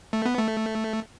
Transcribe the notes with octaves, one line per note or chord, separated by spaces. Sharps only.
A3
B3
A3